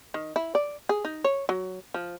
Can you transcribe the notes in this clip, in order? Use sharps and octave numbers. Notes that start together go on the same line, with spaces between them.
D#3
E4
D5
G#4
D#4
C#5
F#3
F3